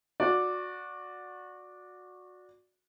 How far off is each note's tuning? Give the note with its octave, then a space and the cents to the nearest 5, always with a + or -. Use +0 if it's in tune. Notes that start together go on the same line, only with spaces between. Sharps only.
F#4 -20 D5 +0